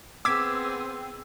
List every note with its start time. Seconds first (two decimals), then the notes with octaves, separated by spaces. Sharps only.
0.25 B3 C4 G#4 D6 E6 G#6 B6